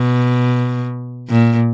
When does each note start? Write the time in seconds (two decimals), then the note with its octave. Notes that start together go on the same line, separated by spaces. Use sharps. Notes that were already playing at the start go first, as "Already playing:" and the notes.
Already playing: B2
1.29 A#2